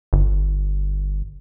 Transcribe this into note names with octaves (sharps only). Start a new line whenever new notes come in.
G1